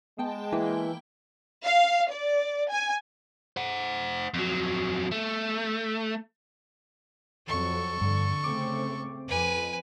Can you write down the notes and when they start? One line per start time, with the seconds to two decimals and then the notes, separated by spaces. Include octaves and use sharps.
0.18 G#3 B3 G5 A5
0.52 E3 A#3 E4 G5
1.63 F5
2.12 D5
2.70 G#5
3.57 C5 F#5
4.34 F2 F#3
5.11 A3
7.47 F2 F#3 A4 C#6
8.01 G2 D3
8.44 C#3 A3 C4 D6
9.28 F2 B4 G#5